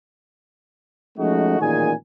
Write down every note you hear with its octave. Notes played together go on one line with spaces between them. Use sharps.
F3 G#3 A3 C#4 D#4 F#4
A1 F#2 A#2 D#3 G#4 G#5